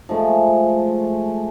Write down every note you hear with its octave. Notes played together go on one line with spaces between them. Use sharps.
F3 G#3 A3